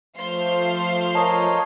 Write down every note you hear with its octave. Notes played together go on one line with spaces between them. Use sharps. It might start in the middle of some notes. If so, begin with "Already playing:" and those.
F3 A3 C5 F5 C6
A#4 C#5 D#5 A5